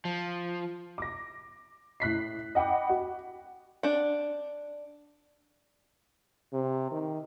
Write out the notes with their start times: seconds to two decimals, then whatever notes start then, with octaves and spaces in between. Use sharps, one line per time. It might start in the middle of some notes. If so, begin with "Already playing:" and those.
0.05 F3
0.98 D6 A#6
2.00 A2 F#6 B6 C7
2.55 D#5 F#5 G5 B5 D6
2.89 F#4
3.83 D4 F#5
6.53 C3
6.91 D#3